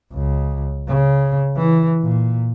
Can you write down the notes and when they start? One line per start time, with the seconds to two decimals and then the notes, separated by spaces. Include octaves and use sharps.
0.13 C#2
0.88 C#3
1.57 E3
2.03 A#2